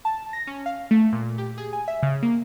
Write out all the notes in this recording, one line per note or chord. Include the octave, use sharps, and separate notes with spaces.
A5
A#6
C#4
F5
A3
A#2
G4
G#4
G#5
E5
C#3
A#3